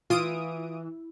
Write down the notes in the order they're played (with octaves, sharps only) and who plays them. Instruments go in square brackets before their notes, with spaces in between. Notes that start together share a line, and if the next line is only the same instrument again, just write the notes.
[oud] E3 [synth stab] F4 D#6 D7